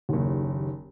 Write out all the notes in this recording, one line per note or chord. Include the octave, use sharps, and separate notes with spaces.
F#1 D#2